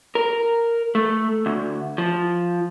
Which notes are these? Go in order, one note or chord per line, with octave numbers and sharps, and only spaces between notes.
A#4
A3
D2
F3